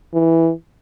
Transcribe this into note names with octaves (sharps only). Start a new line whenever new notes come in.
E3